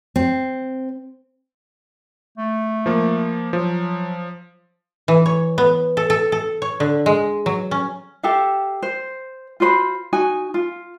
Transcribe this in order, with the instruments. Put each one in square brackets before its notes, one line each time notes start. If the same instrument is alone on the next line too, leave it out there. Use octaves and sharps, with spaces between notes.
[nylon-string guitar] C4
[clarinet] A3
[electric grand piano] F3 A#3
[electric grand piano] F3 [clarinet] F#3
[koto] E3
C#5
B3
A4
A4
A4
C#5
D3
G#3
F#3
C#4
[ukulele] G4 A4 E5 F5
C5
F4 F#4 C5 B5
D#4 F#4 G#5
F4